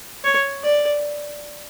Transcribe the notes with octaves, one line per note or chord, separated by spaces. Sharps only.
C#5
D5